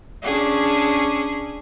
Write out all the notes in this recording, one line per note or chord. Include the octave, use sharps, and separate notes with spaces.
C#4 D4 G#4